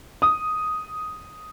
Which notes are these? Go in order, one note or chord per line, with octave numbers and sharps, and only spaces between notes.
D#6